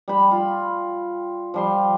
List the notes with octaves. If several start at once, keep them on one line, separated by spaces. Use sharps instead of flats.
G3 B5
F4
F3 G3 C6